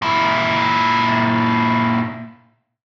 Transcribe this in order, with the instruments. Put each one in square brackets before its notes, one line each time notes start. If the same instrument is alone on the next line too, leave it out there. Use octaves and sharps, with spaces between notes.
[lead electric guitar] A#2 E4